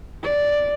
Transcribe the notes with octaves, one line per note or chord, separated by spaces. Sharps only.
D5